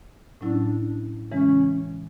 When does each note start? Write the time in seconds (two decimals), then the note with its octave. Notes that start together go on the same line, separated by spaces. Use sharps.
0.41 A2 F#3 C#4 D4 E4
1.31 C#3 E3 G#3 C#4